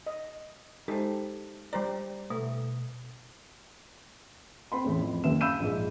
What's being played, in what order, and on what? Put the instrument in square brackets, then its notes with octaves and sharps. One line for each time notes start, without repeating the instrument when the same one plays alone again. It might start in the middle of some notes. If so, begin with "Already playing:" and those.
[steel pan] D#5
[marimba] G#3 C5 [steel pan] D#4 G4 A4
[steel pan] G3 C5 D5 [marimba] A#5
[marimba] B2 [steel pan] A3
[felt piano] C4 B5 C6
E2 A2 C#4
F2
F#1 D#2 B4 E5 E7
F5 B5 E6 G6 D#7 E7
A#1 G#2